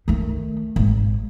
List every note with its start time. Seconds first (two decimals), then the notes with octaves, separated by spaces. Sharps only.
0.08 D#3 A3
0.76 G#1